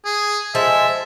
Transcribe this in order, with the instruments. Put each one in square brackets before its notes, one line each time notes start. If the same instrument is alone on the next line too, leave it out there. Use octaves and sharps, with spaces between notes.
[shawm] G#4
[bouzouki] F3 G#3 A4 [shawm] E5